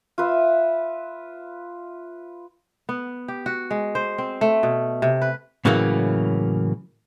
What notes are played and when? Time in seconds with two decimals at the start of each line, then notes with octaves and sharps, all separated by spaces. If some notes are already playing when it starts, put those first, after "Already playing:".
0.18 F4 B4 E5
2.89 B3
3.28 G4
3.46 F#4
3.71 G#3
3.95 C5
4.18 C4
4.41 A3
4.63 B2
5.02 C3
5.22 B4
5.65 A2 C#3 E3 F#3 A#3